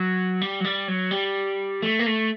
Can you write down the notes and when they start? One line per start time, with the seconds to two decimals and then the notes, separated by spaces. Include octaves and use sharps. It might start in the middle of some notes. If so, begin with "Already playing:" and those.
Already playing: F#3
0.41 G3
0.60 F#3
0.65 G3
0.88 F#3
1.11 G3
1.82 A3
1.99 A#3
2.06 A3